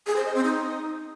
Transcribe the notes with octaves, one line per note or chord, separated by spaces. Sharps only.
G#4
C5
D#5
C4
D#4